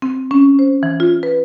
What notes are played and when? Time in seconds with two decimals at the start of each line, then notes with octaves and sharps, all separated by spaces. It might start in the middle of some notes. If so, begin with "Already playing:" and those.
0.02 C4
0.31 C#4
0.59 C5
0.83 E3
1.00 F4
1.23 B4